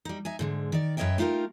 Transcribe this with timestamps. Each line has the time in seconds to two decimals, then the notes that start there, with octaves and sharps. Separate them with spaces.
0.05 G3 D#4
0.25 D#4 E5 G#5
0.39 G#2 D3 G#3
0.72 D#3 D5
0.97 F#2 B4 C#5 D#5 E5 G5
1.18 A3 D#4 F4 G4 A#4